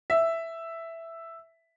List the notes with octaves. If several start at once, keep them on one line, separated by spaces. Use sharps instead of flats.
E5